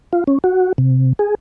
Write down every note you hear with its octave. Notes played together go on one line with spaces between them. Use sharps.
F4
C#4
F#4
C3
G#4